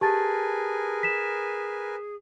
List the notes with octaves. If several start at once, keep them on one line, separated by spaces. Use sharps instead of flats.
G4 G#4 A#4 B4 G#5 A5 A6
B6 E7